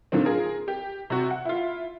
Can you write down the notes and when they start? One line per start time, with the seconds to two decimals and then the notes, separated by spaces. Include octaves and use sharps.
0.12 A#2 D3 D#3 C4
0.25 F4 G#4 A#4
0.68 G4
1.10 C3 F#4
1.31 F#5
1.45 E4 F4